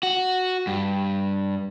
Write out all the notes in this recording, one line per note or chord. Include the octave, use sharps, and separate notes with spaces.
F#4
G2